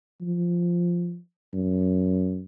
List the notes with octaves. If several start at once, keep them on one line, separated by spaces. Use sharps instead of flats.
F3
F#2